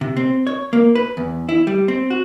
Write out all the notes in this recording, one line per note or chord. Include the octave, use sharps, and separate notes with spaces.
C3
C4
C#5
A#3
B4
E2
E4
G3
C4
F#4